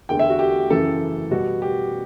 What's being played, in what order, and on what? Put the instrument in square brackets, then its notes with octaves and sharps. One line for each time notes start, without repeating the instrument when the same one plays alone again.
[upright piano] E2 D3 A3 G5
E5
F#4
G4
F#2 C#3 E3 A3 A4
B2 G3 B3 F#4
G4